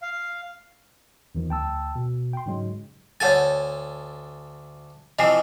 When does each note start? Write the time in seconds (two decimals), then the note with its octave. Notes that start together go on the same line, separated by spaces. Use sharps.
0.02 F5
1.35 E2 D#3 F3
1.49 D2 G5 A5 E6
1.96 B2
2.33 G5 C6
2.46 G#2 C#3 F#3 G#3
3.20 D2 A4 C#5 F#5 G#5 A6
5.19 C3 E3 F3 D#5 G#5 C7